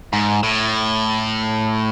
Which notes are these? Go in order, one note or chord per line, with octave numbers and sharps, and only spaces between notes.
G#2
A2